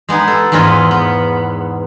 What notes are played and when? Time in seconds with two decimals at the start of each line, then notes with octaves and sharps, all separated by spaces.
0.09 G#3 B3 D#4 G#4
0.28 A4
0.52 E2 G#2 B3 F4 D#5
0.91 B3